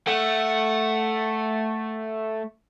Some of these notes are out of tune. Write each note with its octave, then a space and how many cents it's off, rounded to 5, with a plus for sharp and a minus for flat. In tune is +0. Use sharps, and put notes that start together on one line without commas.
A3 +0 F#5 +0